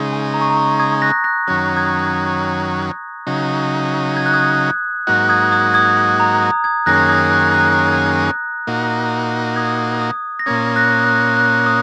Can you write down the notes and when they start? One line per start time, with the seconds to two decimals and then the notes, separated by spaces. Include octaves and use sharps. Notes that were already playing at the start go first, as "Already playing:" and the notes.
Already playing: C#3 G#3 D#4
0.13 G#5
0.34 A#5
0.41 C#6
0.50 A#5
0.57 C#6
0.80 D#6 G#6
1.02 F#6 A#6
1.24 F#6 A#6
1.47 F#2 D#3 F#3 C#4 F#6 A#6
1.76 D#6 G#6
2.07 D#6 G#6
3.27 C#3 F#3 D#4
4.17 G#6
4.26 F#6
4.33 D#6 G#6
5.07 G#2 F#3 A#3 D#4 F#4 F#6
5.29 D#6 G#6
5.52 D#6 G#6
5.74 D#6 G#6
5.97 D#6
6.20 A#5
6.42 D#6
6.64 D#6 G#6
6.86 F#2 D#3 A#3 C#4 G#4 F#6 A#6
7.09 D#6 G#6
7.31 F#6
7.54 F#6
8.67 A#2 A#3 D#4 F#4
9.56 D#6 G#6
10.01 D#6
10.39 A#6
10.46 A#2 A#3 C#4 D#6 G#6
10.76 F#6 A#6
11.01 D#6
11.07 F#6
11.37 F#6
11.66 D#6